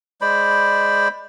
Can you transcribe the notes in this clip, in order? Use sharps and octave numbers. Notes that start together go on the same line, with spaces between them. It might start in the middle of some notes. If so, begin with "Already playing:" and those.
G#3 C5 D5 B5